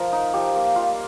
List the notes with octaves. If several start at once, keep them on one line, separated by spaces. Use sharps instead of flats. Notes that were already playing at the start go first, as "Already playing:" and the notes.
Already playing: F3 A#4
D#4
F3 G4
A#3
G3 F4